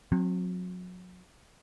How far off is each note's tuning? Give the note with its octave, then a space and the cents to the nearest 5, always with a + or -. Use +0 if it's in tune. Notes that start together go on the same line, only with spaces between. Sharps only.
F#3 -30 C4 +20